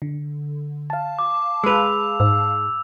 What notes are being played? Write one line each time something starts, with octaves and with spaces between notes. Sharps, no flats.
D3
F5 A5
D6
G#3 B4 E6 F7
G#2 E6